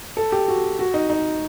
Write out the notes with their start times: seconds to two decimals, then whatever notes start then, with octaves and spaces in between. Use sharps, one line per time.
0.17 A4
0.32 G4
0.48 F#4
0.79 F#4
0.94 D#4
1.10 D#4